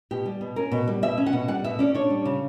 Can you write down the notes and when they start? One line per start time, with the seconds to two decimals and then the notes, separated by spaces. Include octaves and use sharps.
0.11 B2 G4
0.26 G3
0.41 B2
0.56 C#4 A#4
0.72 B2
0.87 G3
1.02 B2 E5
1.18 C#4
1.26 F#5
1.33 B2
1.48 G3 F#5
1.64 B2 E5
1.79 C#4 D5
1.95 D4 C#5
2.10 G3
2.25 C#3